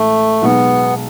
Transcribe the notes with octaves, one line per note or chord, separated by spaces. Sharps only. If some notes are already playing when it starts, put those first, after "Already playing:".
Already playing: A1 A2 G#3 A3
B1 B2 G#3 B3